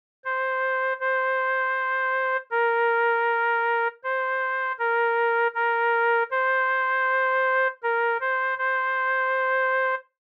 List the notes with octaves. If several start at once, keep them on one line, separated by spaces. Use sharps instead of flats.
C5
C5
A#4
C5
A#4
A#4
C5
A#4
C5
C5